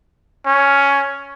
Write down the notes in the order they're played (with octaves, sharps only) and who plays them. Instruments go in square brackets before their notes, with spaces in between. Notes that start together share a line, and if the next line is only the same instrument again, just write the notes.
[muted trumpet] C#4